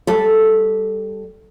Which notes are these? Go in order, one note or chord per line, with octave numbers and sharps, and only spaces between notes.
G3 A4